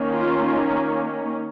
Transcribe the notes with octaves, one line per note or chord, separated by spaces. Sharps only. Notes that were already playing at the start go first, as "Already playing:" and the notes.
Already playing: D#3 A#3 C#4
F4